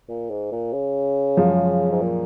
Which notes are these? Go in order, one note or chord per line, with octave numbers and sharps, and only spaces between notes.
A#2
G#2
A#2
C#3
F#2 F3 G#3
G#2
A#2